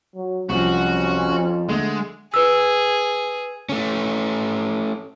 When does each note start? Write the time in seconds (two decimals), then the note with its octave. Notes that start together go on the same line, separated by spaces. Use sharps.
0.16 F#3
0.49 C2 F2 F3 F#3 C#4 F#4
1.28 F3
1.69 D3 G#3 A3
2.34 G#4 B4 E6
3.69 A3 C#4